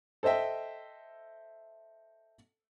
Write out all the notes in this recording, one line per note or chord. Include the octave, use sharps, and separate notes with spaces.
A4 C5 D#5 E5 G5